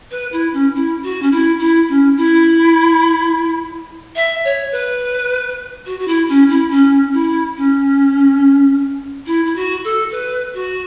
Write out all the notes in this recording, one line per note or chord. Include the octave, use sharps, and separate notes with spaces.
B4
E4
C#4
E4
F#4
C#4
E4
E4
C#4
E4
E5
C#5
B4
F#4
F#4
E4
C#4
E4
C#4
E4
C#4
E4
E4
F#4
A4
B4
F#4